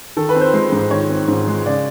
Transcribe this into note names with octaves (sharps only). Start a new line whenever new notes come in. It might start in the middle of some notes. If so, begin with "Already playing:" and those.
D#3 A4
B4
C4
C5
G#3
G#2
D#3 C#5
C4
G#2
G#3
C#3 D5